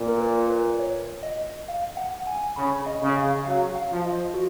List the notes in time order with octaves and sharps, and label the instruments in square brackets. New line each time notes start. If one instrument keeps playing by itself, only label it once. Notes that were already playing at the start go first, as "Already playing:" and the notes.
Already playing: [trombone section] A#2
[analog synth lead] A#4
B4
B4
C#5
D#5
F5
F#5
G#5
[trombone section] C#3 [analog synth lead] B5
[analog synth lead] D#5
[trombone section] C#3
[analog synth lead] F5
[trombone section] F#3 [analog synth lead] F5
[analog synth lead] F5
[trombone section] F3
[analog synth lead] D#5
F#4